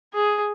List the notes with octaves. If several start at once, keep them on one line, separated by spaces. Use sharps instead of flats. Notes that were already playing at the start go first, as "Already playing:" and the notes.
G#4